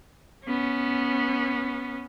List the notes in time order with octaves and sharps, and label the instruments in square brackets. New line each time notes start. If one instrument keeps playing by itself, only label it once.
[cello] B3 C#4